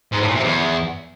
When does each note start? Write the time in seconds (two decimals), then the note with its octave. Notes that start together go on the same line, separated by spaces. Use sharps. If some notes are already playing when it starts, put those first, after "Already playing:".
0.12 G#2
0.20 A2
0.28 A#2
0.36 C3
0.44 E2